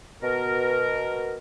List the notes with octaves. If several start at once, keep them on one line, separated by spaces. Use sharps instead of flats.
B2 A#4